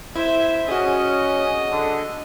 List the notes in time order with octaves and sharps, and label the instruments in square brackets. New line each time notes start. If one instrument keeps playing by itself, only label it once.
[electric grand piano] E4 [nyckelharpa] C5 E5
[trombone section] C#4 [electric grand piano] F#4 G#4 [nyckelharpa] D#5
[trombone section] D3